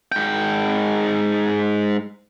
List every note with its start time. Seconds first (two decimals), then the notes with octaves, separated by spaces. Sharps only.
0.12 G#2 G5